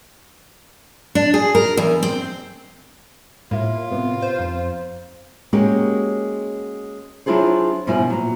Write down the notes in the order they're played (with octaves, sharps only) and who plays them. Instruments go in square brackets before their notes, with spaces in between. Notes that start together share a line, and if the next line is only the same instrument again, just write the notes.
[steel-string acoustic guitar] D4
G#4
A#4
E2
C4
[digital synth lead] A2 [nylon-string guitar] A#3 E5 [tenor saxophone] F4
[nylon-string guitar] C3 B3
[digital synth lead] C5
[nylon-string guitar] F2
G#3 A#3 C#4 F#4 G4
F#3 D4 E4 F4 G#4 C5
G2 B2 F3 E4 F4 G#5
A#2 F#3